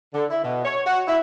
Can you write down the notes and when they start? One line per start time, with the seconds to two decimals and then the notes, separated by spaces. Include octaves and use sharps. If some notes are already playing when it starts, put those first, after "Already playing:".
0.14 D3
0.31 E4
0.43 B2
0.65 C#5
0.86 F#4
1.08 E4